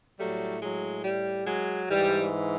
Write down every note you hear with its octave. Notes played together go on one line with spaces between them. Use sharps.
A2 F#3 G3 A3
F#3 G#3
G3
F#3 G#3
G#2 E3 G3